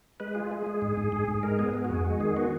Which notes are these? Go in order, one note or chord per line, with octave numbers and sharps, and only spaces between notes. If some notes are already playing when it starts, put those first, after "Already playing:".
G#3 B4
F4 G#4
G#3 G#4
G#3
G#2
G#2
G#2
G#2
G#3 A#4
B3 G#4
B3
F#4
F2 G#4
G#3 F#4
D#3 G#4
B3 F#4